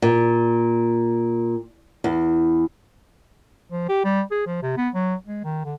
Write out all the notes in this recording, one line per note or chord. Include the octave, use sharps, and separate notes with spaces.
A#2
E2
F3
G4
G3
G#4
F3
C3
B3
F#3
G#3
D#3
D3